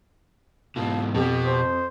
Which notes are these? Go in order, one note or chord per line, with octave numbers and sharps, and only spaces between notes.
G#2 B2 F5 A5
F2 B2 G4
C5